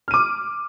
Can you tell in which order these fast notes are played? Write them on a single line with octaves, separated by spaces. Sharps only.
F6 D#7 D6